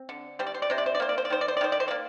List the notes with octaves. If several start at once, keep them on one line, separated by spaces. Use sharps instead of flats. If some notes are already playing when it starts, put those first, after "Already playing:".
Already playing: C4
D3
G3 C5
D5
C5
D5
C3 C5
D5
C5
D5
A#3 C5
D5
C5
D5
D#3 C5
D5
C5
D5
D#3 C5
D5
C5
D5
A#3